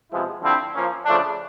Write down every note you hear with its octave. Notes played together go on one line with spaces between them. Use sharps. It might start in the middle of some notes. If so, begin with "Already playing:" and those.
C3 F3 G#3 B3 E4
D3 F3 A3 C4 E4
F3 A#3 C#4
C#3 F3 A3 D4